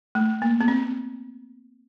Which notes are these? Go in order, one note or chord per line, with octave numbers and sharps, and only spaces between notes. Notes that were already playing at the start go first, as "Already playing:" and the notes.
A3
A#3
B3
C4